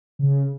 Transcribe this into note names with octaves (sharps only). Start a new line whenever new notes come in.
C#3